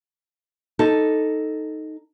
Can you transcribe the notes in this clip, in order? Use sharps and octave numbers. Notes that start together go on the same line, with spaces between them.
D#4 A4